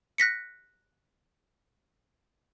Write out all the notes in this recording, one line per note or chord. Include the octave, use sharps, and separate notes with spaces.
F#6 A#6 B6 C#7